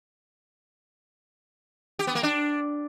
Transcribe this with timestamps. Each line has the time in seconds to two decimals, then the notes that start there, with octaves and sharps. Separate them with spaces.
1.99 G4
2.07 B3
2.15 A#3
2.23 D4